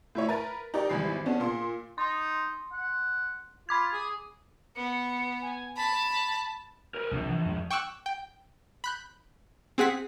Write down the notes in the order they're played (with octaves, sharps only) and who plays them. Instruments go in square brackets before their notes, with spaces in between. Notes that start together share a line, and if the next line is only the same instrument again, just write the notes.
[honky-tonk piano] A2 E4 C#5
A#4 B4 A6
D#4 G4 A#4 D5
G#1 E2 G3 B5 C7
B3 C#4 D4 G#4
A#2 C6
[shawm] D#4 [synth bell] C6
[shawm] F#5
[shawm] F4 [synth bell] B5 D6 G#6
[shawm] G#4
[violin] B3 [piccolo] C#7
[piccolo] G#5
[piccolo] A5 [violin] B5 B6
[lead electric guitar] A#4 B4
[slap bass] C2 E3 C4 [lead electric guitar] F3 D4
[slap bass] E3
F2 G#3
[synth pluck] G5 C#6 D6 E6 F#6
G5
B5 F#6 G6
C4 G#4 F#5 B6